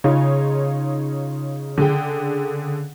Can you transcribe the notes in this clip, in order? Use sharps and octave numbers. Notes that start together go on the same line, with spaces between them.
C#3 D#4 F4 C#5
D3 G#4 G5